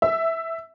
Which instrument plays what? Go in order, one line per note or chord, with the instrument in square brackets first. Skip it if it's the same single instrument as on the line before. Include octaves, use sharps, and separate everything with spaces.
[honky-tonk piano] E5